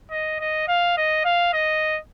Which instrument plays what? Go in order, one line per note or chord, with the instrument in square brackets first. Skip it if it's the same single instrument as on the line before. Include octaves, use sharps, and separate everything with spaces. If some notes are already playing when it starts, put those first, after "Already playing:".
[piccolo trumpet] D#5
D#5
F5
D#5
F5
D#5